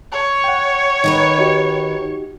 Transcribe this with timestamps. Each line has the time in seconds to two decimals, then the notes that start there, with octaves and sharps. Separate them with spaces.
0.12 C#5
0.44 F#5 G5
1.04 D#3 A#4 B4
1.39 D#4 F#4 G4